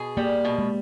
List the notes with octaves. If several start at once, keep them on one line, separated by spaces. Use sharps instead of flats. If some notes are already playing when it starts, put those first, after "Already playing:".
Already playing: B2 G#4
G3 A#3
B2
G#3